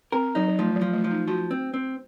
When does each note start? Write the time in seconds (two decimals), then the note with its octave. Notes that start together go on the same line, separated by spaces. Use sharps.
0.12 C4 A#4
0.35 F#3 D#4
0.48 F#3
0.59 F3 A3
0.76 F#3
0.81 F3
0.93 A3
1.04 F3
1.11 D#4
1.28 F3 F#4
1.51 C4
1.74 C4